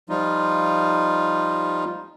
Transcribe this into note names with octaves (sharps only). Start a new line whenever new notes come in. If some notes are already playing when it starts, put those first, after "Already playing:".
F3 G3 D#4 F4